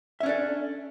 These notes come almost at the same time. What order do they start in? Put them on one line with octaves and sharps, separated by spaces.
E5 C#4 D4 A4